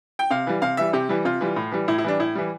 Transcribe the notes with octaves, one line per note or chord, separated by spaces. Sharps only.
G5
C3 F5
E3 G3
C3 F5
E3 G3 E5
C3 G4
E3 G3
C3 F4
E3 G3
A2
E3 G3
A2 E4
E4
E3 G3 D4
A2 E4
E3 G3